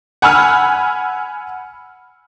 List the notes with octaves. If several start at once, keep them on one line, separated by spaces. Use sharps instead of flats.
F#5 G#5 B5 E6 F6